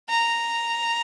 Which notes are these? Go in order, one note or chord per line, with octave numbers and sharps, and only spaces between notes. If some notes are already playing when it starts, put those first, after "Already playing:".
A#5